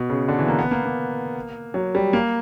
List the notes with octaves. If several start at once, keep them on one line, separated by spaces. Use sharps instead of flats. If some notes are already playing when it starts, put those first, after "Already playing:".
Already playing: B2
C#3
D3
E3
A#3
B3
A#3
A#3
F#3
G3
A#3